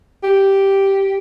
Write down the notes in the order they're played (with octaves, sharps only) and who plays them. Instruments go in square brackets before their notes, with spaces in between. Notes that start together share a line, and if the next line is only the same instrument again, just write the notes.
[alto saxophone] G4